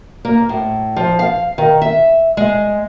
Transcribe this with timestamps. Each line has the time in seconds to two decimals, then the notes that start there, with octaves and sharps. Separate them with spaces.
0.25 A#3
0.49 A2
0.96 F3
1.19 F5
1.58 D#3
1.82 E5
2.37 G#3